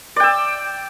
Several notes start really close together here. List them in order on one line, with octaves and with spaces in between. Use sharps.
D5 G5 E6